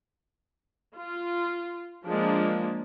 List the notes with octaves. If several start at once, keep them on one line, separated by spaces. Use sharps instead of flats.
F4
F3 G#3 A#3 D4